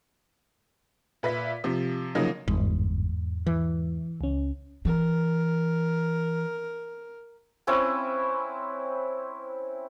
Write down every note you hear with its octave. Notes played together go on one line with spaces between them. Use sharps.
A#2 B4 E5 B6
C3 F3
C#3 F3 F#3 A#3 D#4
G1 E2 G#2
E3
C#2 C#4
E3 A#4
C4 C#4 E4 B4